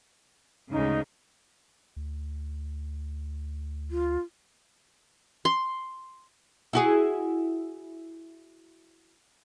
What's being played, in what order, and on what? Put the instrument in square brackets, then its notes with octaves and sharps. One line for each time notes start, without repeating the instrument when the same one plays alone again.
[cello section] D2 G#2 C#3 [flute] D#4
[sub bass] D2
[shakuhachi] F4
[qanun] C6
[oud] E4 F#4 G#4